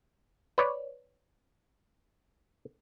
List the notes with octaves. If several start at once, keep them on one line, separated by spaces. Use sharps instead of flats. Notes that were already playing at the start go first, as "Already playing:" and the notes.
B4 C#5 D5